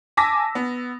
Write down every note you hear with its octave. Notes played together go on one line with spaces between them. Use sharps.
G#5 A5 D6 E6 A#6 B6
B3